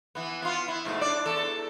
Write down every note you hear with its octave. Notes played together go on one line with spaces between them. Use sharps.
E3 B3
B3 F4
E4
G#2 B2 A3
D4 D5
E2 A4